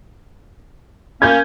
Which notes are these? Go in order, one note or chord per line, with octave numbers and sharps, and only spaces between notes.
A#3 C#4 G6 G#6